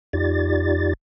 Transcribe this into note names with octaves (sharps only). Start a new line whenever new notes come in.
F2 D#4 F4 G4 D5 A6